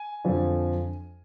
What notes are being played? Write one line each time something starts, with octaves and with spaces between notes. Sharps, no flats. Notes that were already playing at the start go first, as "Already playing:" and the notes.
Already playing: G#5
F2 D3 F3